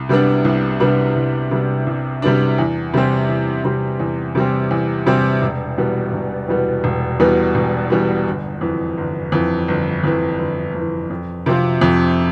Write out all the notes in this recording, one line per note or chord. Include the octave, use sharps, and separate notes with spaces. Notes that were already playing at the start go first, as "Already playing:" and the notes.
Already playing: C2
C3 G3 B3 D4
C2
C3 G3 B3 D4
C2
C3 G3 B3 D4
C2
C3 G3 B3 D4
E2
C3 G3 C4
E2
C3 G3 C4
E2
C3 G3 C4
E2
C3 G3 C4
E1
E2 B2 G3 B3
E1
E2 B2 G3 B3
E1
E2 B2 G3 B3
E1
E2 B2 G3 B3
G1
F2 E3
G1
F2 E3
G1
F2 E3
G1
F2 E3
F2
C3 F3 C4 F4
F2